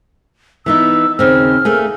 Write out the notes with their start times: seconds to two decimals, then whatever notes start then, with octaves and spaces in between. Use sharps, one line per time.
0.66 E3 B3 D#4 E6
1.19 D#2 C#3 C4 F6
1.65 A3 A#3 G#4